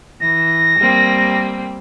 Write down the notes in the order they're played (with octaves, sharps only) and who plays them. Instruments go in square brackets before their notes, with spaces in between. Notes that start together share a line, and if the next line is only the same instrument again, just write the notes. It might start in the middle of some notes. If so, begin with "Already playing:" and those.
[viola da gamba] E3 [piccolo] A#6
[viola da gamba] G3 A#3 C4